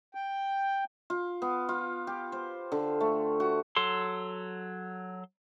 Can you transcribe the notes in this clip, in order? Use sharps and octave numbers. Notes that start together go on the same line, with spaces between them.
G5
F4
B3
F4
G4
C5
D3
A3
F#4
F#3 A4 C6